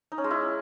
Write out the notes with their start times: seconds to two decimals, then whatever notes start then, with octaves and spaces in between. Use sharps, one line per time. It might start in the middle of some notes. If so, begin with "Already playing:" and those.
0.12 D#4
0.18 C#4
0.24 G#3
0.31 E4